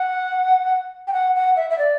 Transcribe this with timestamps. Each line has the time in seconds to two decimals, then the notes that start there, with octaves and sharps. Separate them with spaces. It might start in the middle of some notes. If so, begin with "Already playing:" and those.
Already playing: F#5
1.07 G5
1.13 F#5
1.36 F#5
1.56 E5
1.70 E5
1.78 D5